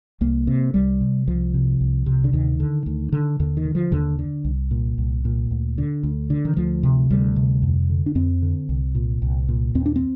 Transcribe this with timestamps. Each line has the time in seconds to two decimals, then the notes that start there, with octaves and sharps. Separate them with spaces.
0.21 C2 A#3
0.47 C3
0.74 C2 G3
1.01 C3
1.27 C2 F3
1.54 C3
1.81 C2
2.06 C3
2.24 D3
2.33 D2 D#3
2.60 D3
2.86 D2
3.12 D3
3.40 D#2 D3
3.57 D#3
3.65 D3
3.75 F3
3.92 D#2 D3
4.19 D3
4.44 C2
4.71 A#2
4.98 C2
5.25 A#2
5.51 D2
5.78 D3
6.03 D2
6.30 D3
6.45 D#3
6.57 D2 F3
6.83 C3
7.10 D2 G3
7.36 C3
7.63 F2
7.90 D3
8.06 D4
8.15 F2 C4
8.42 D3
8.69 C2
8.95 A#2
9.22 C2
9.49 A#2
9.75 D#2 C4
9.86 D4
9.96 C4